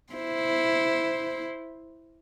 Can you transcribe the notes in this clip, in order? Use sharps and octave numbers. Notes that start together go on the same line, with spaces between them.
E4 C5